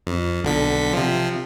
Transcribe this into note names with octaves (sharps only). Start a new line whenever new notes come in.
F2
B1 D3 B6
C3 F3